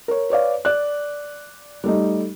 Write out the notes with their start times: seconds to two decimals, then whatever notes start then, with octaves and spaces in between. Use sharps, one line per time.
0.08 A#4 C#5
0.30 B4 C#5 D5 F5
0.65 D5 F#6
1.84 G3 A3 D#4